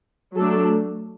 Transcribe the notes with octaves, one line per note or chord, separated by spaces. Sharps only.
F#3 A3 D4 A4